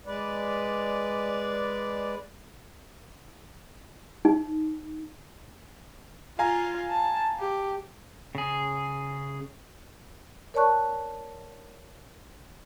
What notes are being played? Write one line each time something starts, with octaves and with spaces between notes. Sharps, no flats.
G#3 B4 D5
D#4
F4 F5 G#5 A#5
A5
G4
C#3 G#4
A#4 C#5 D5 A5 C#6 F#6